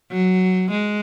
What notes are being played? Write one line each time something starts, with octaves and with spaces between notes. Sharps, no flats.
F#3
G#3